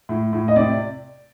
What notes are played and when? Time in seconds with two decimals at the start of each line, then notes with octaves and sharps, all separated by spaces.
0.09 A2
0.33 A2
0.48 D#5
0.56 C3 D5